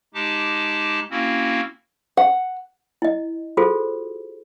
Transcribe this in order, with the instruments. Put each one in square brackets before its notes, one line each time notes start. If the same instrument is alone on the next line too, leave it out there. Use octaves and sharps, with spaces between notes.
[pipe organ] G#3 D#4 G4 A5 D6
A#3 C4 C#4 E4 F#4
[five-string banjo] F#5
[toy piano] E4 D#5
F4 F#4 G#4 A4 C5